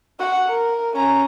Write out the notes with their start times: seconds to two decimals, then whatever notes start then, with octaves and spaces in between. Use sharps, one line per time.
0.19 F#4 F#5
0.49 A#4
0.96 C#4 A#5